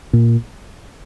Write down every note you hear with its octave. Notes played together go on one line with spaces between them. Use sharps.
A#2